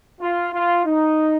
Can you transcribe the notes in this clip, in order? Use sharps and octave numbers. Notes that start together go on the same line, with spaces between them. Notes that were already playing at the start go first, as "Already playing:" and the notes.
F4
F4
D#4